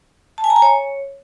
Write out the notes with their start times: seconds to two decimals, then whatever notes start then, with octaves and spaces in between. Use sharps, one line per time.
0.38 A5
0.44 G#5
0.50 A#5
0.56 G#5
0.62 C#5